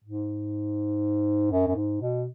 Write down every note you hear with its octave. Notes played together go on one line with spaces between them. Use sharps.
G#2
F#2
F#2
G#2
B2